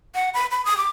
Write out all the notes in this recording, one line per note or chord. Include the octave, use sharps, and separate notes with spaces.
F#5
B5
B5
D#6
D6